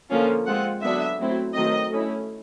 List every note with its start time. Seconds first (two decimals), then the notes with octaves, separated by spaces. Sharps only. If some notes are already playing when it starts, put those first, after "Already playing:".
0.10 D3 F3 A#3 C#4 F4
0.46 G#3 C4 F4 F#5
0.82 D3 F#3 B3 D4 E5
1.19 F#3 A3 C4 E4
1.54 D#3 F#3 A3 C4 D#5
1.90 A3 C#4 E4